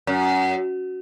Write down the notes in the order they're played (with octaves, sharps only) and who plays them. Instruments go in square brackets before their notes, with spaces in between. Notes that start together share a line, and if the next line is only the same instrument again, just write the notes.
[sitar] F#2